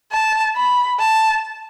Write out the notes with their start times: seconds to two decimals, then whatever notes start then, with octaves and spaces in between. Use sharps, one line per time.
0.12 A5
0.56 B5
1.00 A5